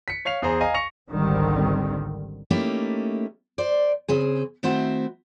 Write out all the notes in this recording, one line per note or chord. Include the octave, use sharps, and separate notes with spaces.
B6 C#7
C#5 F5 C7 F7
E2 G#4 C5 A#5
D#5 F5 G#5 A#5
C#6 A#6 C#7 F7
G#1 C#2 D3 D#3 G3 C4
A3 A#3 C#4 D#4 E4 G4
C5 D5
C#3 C4 G#4
D#3 A3 C4 E4 F#4 C5